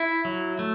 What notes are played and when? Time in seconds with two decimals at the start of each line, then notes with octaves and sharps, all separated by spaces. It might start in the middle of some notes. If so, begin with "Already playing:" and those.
Already playing: E4
0.25 F#3
0.59 A3